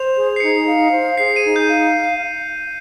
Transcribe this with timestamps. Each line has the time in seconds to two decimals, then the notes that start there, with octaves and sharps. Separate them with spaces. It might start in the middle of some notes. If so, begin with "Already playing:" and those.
Already playing: C5 F7
0.16 G#4
0.36 C7
0.40 D#4 C#7
0.66 F5
0.92 C5
1.17 G#4 C7
1.36 D#7
1.43 D#4
1.56 G6
1.68 F5
1.74 G6